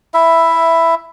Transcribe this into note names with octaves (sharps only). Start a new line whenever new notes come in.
E4 E5